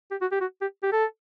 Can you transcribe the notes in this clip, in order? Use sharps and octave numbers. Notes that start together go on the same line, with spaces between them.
G4
F#4
G4
F#4
G4
G4
A4